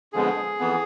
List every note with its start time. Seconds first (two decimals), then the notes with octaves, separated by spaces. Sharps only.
0.13 F2 D3 F3 G#3 B3 G#4
0.59 F2 E3 B3